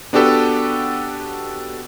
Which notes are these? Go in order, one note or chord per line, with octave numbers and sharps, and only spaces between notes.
B3 D4 F#4 G4 A4 B4